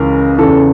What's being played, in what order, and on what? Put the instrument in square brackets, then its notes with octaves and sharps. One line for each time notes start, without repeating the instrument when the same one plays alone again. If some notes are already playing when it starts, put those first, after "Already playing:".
Already playing: [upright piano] C#2 C#3 E3 A#4
E2 C#3 E3 A4